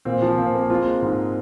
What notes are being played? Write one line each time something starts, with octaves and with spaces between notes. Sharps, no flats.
A#2 C4
F3
A#2 C4
A#3
G#3 C4 F4
G#3
G#2